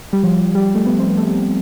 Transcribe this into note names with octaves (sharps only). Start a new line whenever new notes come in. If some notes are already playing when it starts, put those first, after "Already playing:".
G3
F3
G3
A3
B3
C4
B3
A3